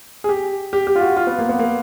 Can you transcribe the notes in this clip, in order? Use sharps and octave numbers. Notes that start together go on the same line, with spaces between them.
G#4
G4
G4
G4
F4
F#4
F4
B3
A#3
B3
A#3